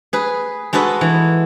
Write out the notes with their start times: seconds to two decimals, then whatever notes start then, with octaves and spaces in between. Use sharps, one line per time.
0.13 G#4 B4
0.73 G#3 F#4 A4 B4 D#5
1.01 E3